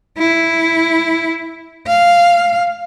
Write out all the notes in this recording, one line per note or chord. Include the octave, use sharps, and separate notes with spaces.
E4
F5